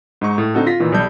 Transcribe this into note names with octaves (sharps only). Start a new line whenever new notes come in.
G#2 D#4 C#6
A2
D3 C4 D#4 F#4 A4
F4 A#6 B6
A#2 D#3 E3
B1 G3 A5 G6